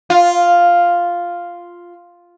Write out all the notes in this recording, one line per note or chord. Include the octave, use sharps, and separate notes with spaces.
F4